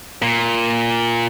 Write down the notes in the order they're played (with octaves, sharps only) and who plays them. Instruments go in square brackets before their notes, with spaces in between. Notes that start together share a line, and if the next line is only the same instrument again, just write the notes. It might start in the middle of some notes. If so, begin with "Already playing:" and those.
[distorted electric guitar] A#2